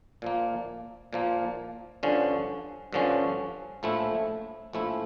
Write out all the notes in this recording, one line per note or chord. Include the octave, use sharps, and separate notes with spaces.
A#2 F3 A#3
A#2 F3 A#3
G2 D3 F3 C#4
G2 D3 F3 C#4
A#1 A2 F3 A3 E4
A#1 A2 F3 A3 E4